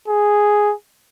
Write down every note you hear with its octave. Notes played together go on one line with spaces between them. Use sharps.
G#4